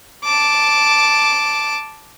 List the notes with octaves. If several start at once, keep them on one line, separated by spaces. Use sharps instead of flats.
A5 D6